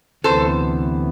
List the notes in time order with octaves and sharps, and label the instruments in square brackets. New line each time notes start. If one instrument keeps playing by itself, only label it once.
[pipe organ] D2 C3 E3 B3 [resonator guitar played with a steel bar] A4 C5